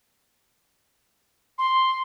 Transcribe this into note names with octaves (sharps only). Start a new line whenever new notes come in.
C6